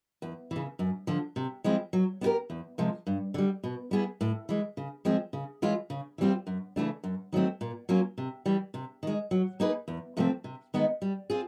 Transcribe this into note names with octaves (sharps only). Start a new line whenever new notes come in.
E2
C#3 E3
F#2
D3 F3
C3
F3 G#3 C4 E4
F#3
B3 E4 G4 A#4
E2
C3 F3 G#3
G2
D3 G3
B2
G3 B3 E4 G#4
A2
E3 G#3
C#3
F3 G#3 C4
C#3
E3 G#3 C#4 F4
C#3
E3 G3 C4 F4
F#2
C#3 E3 A3 D4
F#2
D#3 F#3 A3 C4
A#2
F#3 A#3 C#4 F4
C3
E3 G3
C3
D#3 G#3
F#3
A#3 D#4 G#4 B4
E2
C3 F3 A3 C4
C3
D#3 G#3 B3 D#4
G3
C4 F4 G#4